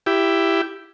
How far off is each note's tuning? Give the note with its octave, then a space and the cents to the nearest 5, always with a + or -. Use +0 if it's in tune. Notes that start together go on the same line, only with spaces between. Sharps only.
E4 +10 G4 +0